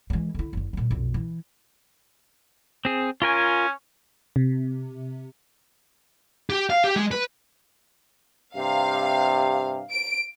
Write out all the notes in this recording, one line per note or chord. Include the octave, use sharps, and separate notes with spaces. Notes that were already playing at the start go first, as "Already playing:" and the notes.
E3 G#3
D3 E4
F#1 D3
A#2 G3
B1 F2
E3
C4 G#4
C#4 F4 A#4 G#5
C3
G4
F5
G4
G#3
B4
G2 C3 F5
D7